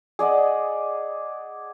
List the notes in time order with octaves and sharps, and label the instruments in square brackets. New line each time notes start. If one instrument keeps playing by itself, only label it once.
[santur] G#4 D5 D#5 F#5